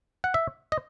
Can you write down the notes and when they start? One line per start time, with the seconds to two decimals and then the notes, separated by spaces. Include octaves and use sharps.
0.24 F#5
0.34 E5
0.72 D#5